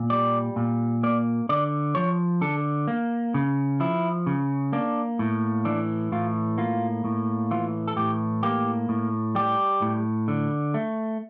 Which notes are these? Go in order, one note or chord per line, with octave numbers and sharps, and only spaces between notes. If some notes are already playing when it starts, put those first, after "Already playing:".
Already playing: A#2
G3 D5
A#2
A#3 D5
D3 D5
F3 C#5
D3 A4
A#3
C#3
F3 E4
C#3
A#3 D4
A2
E3 D4
A2 F4
A#3 F4
A2
E3 F4
A4
A2 G4
A#3 G4
A2
G3 G4
A2
D3
A3